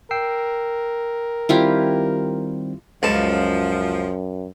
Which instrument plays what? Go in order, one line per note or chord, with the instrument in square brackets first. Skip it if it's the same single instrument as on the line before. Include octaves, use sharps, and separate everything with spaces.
[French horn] A#4 [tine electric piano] G5 E6 C7
[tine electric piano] D#3 G3 C4 [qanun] E4 F4 G4
[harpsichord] C#2 A5 [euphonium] F#2 [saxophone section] F3